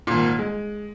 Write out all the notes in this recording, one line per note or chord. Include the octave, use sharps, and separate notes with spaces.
G#1 A#2
G#3